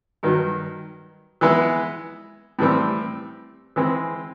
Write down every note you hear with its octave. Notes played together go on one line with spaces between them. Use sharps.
G2 D#3 F#3
E3 G#3 B3 E4
A2 E3 G3 C4
E3 G#3 C4